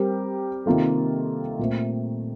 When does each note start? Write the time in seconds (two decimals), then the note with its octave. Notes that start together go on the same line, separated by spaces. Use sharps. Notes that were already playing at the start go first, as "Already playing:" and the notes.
Already playing: G3 C4 G4 A#4
0.66 C3 D#3 A#3 F4 A4
1.59 A#2 A3 C4